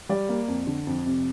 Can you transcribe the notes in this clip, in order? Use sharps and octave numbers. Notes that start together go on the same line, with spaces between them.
G3 D5
A#3
F2
D3
F2
C3